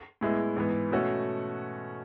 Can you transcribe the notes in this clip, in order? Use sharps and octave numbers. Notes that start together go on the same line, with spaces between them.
A2 G#3 B3 E4
G#2 E3 B3
B2 A3 C#4 F#4 A4